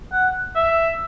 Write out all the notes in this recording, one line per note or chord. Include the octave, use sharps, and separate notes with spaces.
F#5
E5